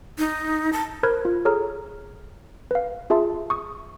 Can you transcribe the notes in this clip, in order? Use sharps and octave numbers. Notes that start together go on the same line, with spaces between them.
D#4
A5
A#4 C5 B5 F6 F#6 G#6
F4
G#4 A4 C#5 A#5 F6
B4 F5
F4 G#4 E5 A5 C6
C#6 D#6